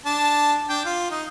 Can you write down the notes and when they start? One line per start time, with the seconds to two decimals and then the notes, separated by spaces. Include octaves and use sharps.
0.06 D4 A5
0.69 D4 G5
0.85 F4
1.11 D#4